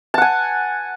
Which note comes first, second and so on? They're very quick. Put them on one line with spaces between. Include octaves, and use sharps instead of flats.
A5 F#5 G#5